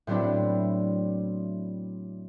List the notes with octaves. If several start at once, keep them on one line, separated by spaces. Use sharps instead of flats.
A2 F#3 B3 C4 D4 E4